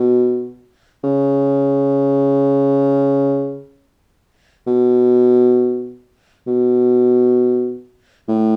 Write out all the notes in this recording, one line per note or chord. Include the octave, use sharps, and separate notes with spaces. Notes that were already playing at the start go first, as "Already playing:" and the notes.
Already playing: B2
C#3
B2
B2
A2